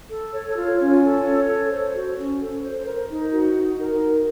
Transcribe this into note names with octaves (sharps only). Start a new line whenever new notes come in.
A4
C#5
F4
C#4
A4
C#5
A4
C5
F#4
C#4
A4
C5
A#4
D#4
F#4
D#4
A#4
D#4